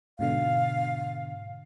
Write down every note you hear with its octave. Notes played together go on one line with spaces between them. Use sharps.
G#2 B2 D3 F5